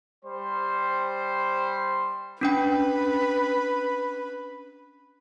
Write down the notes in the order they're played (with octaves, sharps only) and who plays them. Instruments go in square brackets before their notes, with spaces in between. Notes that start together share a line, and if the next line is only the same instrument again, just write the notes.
[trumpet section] G3 C5
[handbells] C#4 D4 G5 [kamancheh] B4